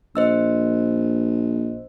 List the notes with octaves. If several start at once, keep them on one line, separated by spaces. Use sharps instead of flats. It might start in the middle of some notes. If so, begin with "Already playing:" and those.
A#1 C5 D#5 E6